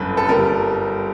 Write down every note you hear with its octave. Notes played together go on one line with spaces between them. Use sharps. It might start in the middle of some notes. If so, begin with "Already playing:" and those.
Already playing: G1 F#2 B4
A4
G3 A#4